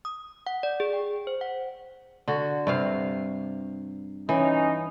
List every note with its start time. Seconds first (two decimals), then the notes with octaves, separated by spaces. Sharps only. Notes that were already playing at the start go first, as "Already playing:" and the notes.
0.05 D#6
0.47 F#5
0.63 D5
0.80 G#4
0.93 G5
1.27 C5
1.41 F#5
2.28 D3 F#4
2.67 G2 C3 F5
4.29 E3 C#4 D#4